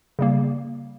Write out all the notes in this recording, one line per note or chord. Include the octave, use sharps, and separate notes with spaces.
C#3 G3 A#3